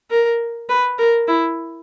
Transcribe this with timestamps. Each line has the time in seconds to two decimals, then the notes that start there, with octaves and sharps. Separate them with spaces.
0.11 A#4
0.69 B4
0.98 A#4
1.28 E4